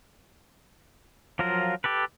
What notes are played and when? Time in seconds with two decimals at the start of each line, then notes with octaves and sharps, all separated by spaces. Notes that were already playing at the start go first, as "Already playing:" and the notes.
1.39 F3 F#3 F4 A#4
1.84 G4 A4 B4